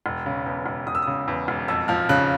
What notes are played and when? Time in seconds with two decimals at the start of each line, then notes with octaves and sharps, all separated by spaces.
0.06 E1
0.26 C#3
0.46 E2
0.66 E1
0.87 E1 D#6
0.95 E6
1.02 C#3 D#6
1.28 E2
1.48 E1
1.68 F2 E6
1.88 F3 F6
2.09 C#3 F#6